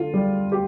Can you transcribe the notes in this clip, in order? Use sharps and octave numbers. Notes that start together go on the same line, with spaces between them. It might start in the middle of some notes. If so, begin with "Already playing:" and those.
Already playing: D3 F4
G3
G4